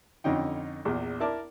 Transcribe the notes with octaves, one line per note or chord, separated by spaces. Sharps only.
F2 D3 C#4 D#4 G5
A#1 E2
E4 A#4 D5 A5 D6